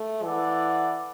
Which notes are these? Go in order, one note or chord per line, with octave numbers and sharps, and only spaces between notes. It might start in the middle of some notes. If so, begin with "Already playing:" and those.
Already playing: A3
E3 E4 A4 D5 F#5